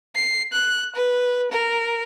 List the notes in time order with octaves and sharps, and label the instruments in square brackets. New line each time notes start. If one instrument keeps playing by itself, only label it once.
[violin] C7
F#6
B4
A#4